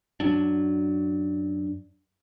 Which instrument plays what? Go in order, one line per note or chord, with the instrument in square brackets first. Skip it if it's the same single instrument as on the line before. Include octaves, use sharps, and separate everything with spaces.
[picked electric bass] F#2 F#3 D4